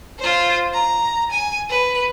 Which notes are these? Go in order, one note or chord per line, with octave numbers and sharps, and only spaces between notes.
F4 C5
A#5
G#5
B4